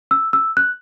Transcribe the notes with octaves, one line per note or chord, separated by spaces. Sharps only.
E6
E6
F#6